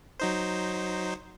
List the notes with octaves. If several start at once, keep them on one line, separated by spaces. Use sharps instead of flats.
F#3 D#4 C5